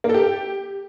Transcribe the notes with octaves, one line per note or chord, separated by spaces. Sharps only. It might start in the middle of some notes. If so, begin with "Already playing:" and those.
A#3
A4
G4